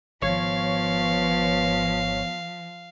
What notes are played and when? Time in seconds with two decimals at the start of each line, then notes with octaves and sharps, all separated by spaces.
0.22 G#1 F3 B3 C#5 F5